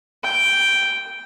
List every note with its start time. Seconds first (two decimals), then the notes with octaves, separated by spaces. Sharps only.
0.23 G5